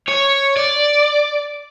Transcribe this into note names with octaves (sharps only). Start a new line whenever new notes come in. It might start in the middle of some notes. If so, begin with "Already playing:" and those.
C#5
D5